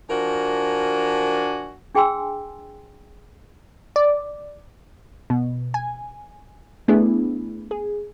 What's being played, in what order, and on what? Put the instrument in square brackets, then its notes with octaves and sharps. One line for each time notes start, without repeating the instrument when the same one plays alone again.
[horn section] F3 D4 F#4 A#4 G#5
[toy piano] D4 G#4 G5 G#5 C6 E6
[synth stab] D5
[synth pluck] B2
G#5
A3 B3 D4 E4 G#4
G#4